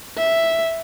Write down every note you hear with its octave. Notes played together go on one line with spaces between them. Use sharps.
E5